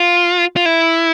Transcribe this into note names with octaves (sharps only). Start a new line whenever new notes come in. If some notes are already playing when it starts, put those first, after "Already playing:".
Already playing: F4
F4
E4